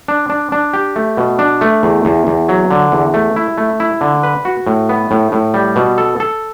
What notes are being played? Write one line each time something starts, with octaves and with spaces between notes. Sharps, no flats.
D4
D4
D4
G4
A3
B2
D4
A3
E2
E2
E2
F#3
D3
E2
A3
E4
A3
E4
D3
B4
F#4
A2
B3
A2
A2
G3
B2
A4
A4